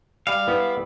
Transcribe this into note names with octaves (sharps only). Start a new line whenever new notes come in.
G3 F5
B3 E4